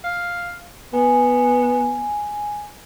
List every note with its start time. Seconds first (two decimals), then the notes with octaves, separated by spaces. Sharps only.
0.04 F5
0.93 B3 G#5